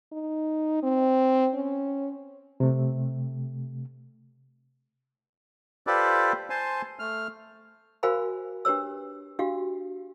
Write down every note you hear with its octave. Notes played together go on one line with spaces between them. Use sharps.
D#4
C4
C#4
C3 A3
F4 G4 A4 B4 C5 D5
C5 G#5 A5 C6
A3 F6
F#4 A#4 C5 F5 G#5 B5
D4 G4 B4 C#5 E6
D4 F#4 G4 F5